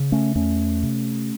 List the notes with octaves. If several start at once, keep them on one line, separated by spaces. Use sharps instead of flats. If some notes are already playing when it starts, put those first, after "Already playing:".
Already playing: C#3
A3 C#4
E2 A3 C#4
C3